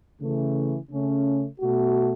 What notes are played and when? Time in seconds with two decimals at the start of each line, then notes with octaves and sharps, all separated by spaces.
0.20 C#3 E3 A3
0.91 C#3 A3 C#4
1.60 B2 A3 F#4